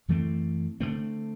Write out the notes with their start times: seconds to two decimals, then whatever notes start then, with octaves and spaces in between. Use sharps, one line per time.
0.08 F#2 E3 A3 C4
0.80 D3 F#3 A3 C4